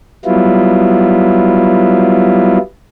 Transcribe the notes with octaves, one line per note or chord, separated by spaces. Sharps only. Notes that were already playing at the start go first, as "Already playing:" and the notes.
F#3 G3 B3 E4 F4